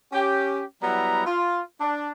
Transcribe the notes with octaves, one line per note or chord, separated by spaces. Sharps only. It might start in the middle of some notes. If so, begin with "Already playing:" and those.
C#4 G4
F#3 G3 B3 E4 A#5
F4
D4